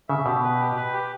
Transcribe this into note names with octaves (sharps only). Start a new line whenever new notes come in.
C#3 E5
B2 G4
B4
G4
B4
G4